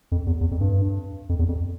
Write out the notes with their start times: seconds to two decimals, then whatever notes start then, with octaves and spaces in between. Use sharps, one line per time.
0.12 F2
0.27 E2
0.41 E2
0.51 F2
0.61 G2
1.29 F2
1.39 E2
1.48 F2